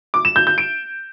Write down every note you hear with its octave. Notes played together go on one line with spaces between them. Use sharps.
D6
E7
G6
G6
D7